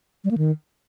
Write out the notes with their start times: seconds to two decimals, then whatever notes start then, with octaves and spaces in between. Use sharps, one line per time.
0.24 G3
0.31 A#3
0.38 D#3